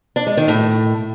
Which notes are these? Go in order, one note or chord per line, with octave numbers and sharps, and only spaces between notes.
D4
G#3
D#3
A2